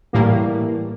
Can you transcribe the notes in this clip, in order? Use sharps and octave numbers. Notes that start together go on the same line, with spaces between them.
A2 E3 G3 A#3